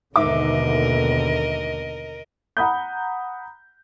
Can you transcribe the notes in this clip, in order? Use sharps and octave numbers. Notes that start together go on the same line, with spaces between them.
D#2 G#2 B2 D3 A#4 D#5 E5 D6
F#5 A#5 B5 D#6 G6